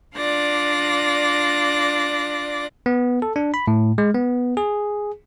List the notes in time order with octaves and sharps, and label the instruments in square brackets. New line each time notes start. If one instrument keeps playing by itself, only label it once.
[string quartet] D4 F4 D5 F#6 A#6
[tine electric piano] B3
A4
D4
B5
A2
G#3
B3
G#4